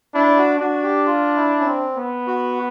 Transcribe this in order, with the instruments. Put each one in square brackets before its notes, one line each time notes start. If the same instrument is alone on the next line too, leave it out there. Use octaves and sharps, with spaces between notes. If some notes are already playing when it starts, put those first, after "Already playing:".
[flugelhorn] D4 [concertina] E4
[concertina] F#4
[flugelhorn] D4 [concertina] F#4
[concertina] G4
F4
E4
C#4
C4
[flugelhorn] B3
[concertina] F#4